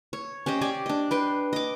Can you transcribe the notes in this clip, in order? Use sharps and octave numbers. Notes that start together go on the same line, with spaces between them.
C#5
C#4 G4 C5 D#5
G4 D5 G#5
D4 D#5
B4 G5 C6
D#5 D6